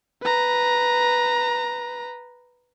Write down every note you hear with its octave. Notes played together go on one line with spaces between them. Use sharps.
B4 A#5